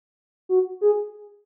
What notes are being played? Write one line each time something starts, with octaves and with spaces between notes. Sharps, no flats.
F#4
G#4